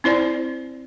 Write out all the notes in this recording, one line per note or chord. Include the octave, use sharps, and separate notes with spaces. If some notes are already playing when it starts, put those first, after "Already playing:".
C4 E4 C5 D5